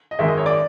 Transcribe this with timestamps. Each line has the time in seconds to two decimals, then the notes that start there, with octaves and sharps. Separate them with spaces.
0.11 D#5
0.19 G#1 F#2 D#3 G#3 E5
0.28 D#5
0.37 C#5
0.46 D5